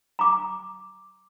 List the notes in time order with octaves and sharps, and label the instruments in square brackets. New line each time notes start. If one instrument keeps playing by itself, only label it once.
[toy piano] A#5 D6